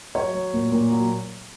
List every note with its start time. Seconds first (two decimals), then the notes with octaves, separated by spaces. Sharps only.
0.15 F#3 C#5
0.34 F#3
0.53 A#2
0.71 A#2
0.90 F#3